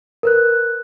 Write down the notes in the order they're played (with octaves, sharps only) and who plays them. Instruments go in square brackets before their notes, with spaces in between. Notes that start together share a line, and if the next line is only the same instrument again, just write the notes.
[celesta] A#4 B4 F#6